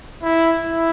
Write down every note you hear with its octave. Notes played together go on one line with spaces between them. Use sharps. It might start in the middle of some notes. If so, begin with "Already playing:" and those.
E4
E4